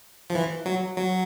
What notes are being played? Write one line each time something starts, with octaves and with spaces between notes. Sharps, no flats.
F3
E3
F#3
F#3